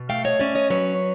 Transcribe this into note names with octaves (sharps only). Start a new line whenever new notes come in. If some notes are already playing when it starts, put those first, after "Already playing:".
Already playing: B2
A3 F5 G5
C#5 D#5
C#4 D5 E5
C#5 D#5
F#3 B4 C#5